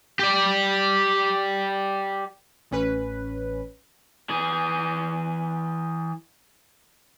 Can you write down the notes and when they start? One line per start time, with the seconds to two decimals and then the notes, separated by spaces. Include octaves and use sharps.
0.19 G4 D5
2.71 A1 C#4 B4
4.30 E3 G#4